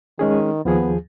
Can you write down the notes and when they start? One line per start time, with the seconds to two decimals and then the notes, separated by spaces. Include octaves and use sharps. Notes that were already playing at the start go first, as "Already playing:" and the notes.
0.19 D#3 G#3 C#4 G#4
0.65 D#2 F3 B3 G#4